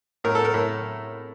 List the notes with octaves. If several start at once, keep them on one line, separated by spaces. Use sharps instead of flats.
A2 A#4
A4
A#4
A2